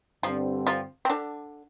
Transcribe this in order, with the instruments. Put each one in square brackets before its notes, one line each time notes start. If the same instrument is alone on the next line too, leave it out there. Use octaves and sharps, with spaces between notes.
[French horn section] G2 D3 G3 C4 [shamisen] F3 F4
[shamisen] F3 F4
C4
D3 D4